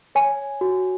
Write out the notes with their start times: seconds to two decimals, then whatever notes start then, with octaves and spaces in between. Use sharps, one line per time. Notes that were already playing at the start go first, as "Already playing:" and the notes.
0.15 C#5 G#5
0.61 F#4